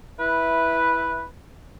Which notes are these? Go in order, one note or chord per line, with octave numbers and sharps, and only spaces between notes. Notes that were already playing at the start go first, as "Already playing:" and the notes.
E4 B4